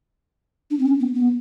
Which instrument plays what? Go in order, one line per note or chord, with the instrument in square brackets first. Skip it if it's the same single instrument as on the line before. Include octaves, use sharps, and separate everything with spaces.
[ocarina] D4
C4
C#4
B3
B3